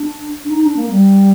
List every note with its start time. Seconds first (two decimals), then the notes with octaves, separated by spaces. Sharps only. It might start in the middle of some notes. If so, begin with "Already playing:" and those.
Already playing: D4
0.44 D4
0.50 D#4
0.64 D4
0.76 A#3
0.91 G3